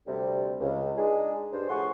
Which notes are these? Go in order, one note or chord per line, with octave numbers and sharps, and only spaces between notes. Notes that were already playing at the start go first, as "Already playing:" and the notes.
D2 C3 G3
C#2
G#3 D4 D#4 G#4
G2 C5
A2 F3 G#4 F#5 C6 C#6